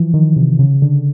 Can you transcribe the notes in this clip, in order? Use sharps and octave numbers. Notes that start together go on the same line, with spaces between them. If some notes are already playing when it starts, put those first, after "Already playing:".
Already playing: E3 F3
D#3
C3
C#3
D3